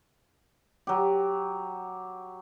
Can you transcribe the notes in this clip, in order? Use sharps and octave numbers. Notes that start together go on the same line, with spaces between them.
F#3 G4